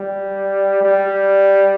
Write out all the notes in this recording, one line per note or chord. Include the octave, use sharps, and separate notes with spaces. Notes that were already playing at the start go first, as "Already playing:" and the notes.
Already playing: G3
G3